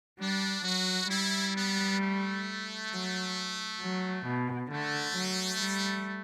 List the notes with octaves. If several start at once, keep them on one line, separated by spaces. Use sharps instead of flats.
G3 D4
F#3 F#4
G3 E4
B3
A3
F#3
F#3
B2
D3 A3
F#3
G3